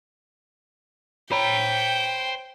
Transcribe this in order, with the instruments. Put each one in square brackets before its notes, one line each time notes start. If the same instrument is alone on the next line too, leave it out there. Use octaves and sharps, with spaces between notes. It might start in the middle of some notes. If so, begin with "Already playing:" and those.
[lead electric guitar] C5 A#5 [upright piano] C#5 B5 [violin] G5